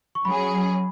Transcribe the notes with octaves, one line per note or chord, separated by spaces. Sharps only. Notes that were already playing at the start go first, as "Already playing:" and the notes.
C#6
F#3 C#4 G#4 B5